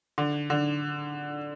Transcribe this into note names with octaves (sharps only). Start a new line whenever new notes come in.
D3
D3